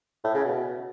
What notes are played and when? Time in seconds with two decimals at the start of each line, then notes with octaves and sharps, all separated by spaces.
0.24 A2
0.35 C#3
0.45 B2